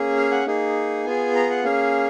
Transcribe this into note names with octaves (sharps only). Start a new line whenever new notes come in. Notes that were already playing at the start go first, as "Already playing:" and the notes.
Already playing: A#3 C#4 G#4
F5
F#5
A#3 D#4 G#4
B3 F4 G#4 G#5
A#5
F#5
A#3 C#4 G#4 F5